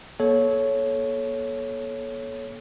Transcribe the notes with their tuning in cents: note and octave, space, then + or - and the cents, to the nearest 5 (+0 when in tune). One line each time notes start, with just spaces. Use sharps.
A#3 +40 A4 -25 C#5 +0